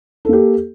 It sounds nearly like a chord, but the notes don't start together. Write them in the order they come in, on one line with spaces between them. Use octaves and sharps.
A4 A#3 G4